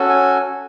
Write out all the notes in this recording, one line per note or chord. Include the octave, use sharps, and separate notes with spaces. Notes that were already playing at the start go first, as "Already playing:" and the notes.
Already playing: C#4 F#4 A4
G#5